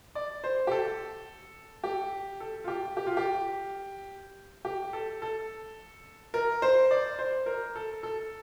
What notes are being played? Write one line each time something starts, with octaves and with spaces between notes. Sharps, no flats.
D5
C5
G4
A4
G4
A4
F4
G4
G4
F4
G4
G4
A4
A4
A#4
C5
D5
C5
A#4
A4
A4